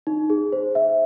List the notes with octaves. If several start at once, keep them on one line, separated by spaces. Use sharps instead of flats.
D#4
G#4
C5
E5